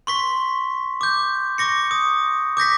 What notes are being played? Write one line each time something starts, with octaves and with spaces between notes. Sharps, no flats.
C6 C#6 B6
D6 G6
C#6 D6 A#6 C#7
D#6
D6 G6 A#6 B6